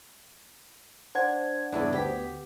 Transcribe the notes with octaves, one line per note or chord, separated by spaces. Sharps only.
D4 C5 F#5 G#6
E2 G2 C#3 D4 E4 A4
D2 B3 G4 B6